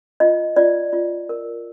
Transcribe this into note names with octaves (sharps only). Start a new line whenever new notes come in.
F4 D#5
F4 D5
F4
A#4